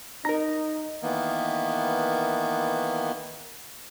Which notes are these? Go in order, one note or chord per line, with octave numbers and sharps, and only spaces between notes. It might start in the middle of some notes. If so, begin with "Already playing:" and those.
D#4 A#4 A#5
D#3 E3 A#3 B3